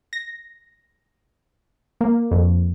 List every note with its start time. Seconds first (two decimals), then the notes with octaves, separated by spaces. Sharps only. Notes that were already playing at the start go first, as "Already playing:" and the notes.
0.13 A#6
2.01 A#3
2.31 F2